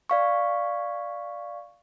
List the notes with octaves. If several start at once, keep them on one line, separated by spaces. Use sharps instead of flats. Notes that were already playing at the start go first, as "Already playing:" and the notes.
D5 F5 C#6